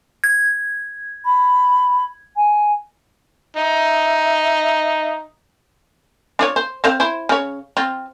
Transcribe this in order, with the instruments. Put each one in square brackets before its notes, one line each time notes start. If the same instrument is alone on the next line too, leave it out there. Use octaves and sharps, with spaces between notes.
[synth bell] G#6
[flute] B5
G#5
[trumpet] D#4 [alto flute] E5
[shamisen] D4 F4 C#5
C5
C4 C5 F5
E4 C5
C#3 C#5
C4 F4